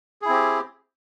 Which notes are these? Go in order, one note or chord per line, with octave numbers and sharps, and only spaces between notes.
C4 E4 G4 G#4